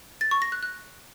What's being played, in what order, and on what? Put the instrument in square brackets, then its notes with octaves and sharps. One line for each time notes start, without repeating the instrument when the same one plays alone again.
[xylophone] A6
C#6
A#6
F#6
F#6